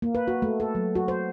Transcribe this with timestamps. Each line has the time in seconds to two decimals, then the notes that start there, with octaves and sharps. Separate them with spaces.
0.02 A#3
0.15 B4
0.28 F#4
0.42 A3
0.60 A4
0.75 F#3
0.95 F#4
1.08 C5